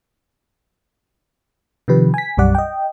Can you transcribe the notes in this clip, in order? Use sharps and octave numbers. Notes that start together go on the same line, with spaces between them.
C3 D#3 F3 G4 B4
G#5 B6
B1 F#2 G3 D5 F#5
D#5 G5